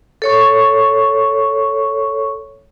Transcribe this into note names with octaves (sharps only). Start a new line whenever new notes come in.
A4 C#5 C#6